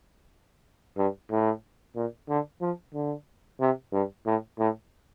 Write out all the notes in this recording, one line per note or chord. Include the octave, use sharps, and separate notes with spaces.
G2
A2
A#2
D3
F3
D3
C3
G2
A2
A2